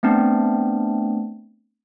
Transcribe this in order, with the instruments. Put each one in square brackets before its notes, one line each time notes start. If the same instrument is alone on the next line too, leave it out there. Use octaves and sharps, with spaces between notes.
[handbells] A3 B3 C4 D4